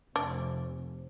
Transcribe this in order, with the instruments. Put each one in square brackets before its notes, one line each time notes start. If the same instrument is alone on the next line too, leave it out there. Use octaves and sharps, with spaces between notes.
[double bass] F1 [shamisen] D4